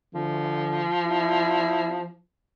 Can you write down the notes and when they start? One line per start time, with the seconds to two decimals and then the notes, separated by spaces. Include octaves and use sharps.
0.14 D3 F3
1.06 E4